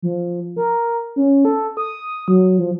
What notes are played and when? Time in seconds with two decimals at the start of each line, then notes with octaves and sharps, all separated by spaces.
0.03 F3
0.56 A#4
1.16 C#4
1.45 A4
1.77 D#6
2.28 F#3
2.59 F3